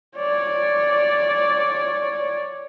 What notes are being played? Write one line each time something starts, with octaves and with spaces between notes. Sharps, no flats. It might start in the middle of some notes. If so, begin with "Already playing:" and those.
C#5 D5